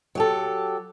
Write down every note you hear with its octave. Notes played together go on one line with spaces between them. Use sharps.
F#3 G4 A4